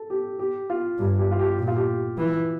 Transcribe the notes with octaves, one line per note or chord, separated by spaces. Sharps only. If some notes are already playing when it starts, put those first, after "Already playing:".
Already playing: A4
G4
G4
F4
G2 G4
G4
F4
G4
A#2 G4
F4
G4
E3